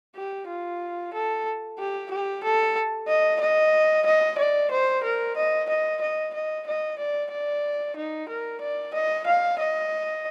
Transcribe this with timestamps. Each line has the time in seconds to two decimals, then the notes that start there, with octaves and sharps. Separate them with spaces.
0.16 G4
0.47 F4
1.13 A4
1.78 G4
2.10 G4
2.43 A4
3.08 D#5
3.40 D#5
4.06 D#5
4.38 D5
4.71 C5
5.03 A#4
5.36 D#5
5.69 D#5
6.01 D#5
6.33 D#5
6.66 D#5
6.98 D5
7.31 D5
7.96 D#4
8.29 A#4
8.61 D5
8.94 D#5
9.26 F5
9.59 D#5